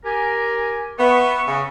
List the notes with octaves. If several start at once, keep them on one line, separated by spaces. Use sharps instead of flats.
G4 A#4 G#5
B3 E5 C#6
C#3